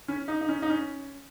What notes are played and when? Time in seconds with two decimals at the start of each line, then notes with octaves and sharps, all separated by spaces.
0.08 C#4
0.28 D#4
0.41 D#4
0.49 C#4
0.62 D#4
0.70 C#4